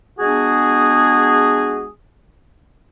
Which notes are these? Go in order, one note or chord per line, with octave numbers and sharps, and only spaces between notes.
G#3 B3 D4 F#4 G#4